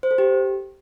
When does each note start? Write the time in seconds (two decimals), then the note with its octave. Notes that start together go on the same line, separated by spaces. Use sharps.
0.03 C5
0.11 A4
0.18 G4